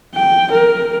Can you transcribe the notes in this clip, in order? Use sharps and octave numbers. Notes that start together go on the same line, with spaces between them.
G5
A#4